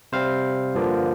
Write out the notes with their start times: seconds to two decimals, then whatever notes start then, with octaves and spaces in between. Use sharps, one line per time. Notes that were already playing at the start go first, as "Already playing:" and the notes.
0.12 C3 G3 C4 C5 F5
0.75 G2 D3 F3 A#3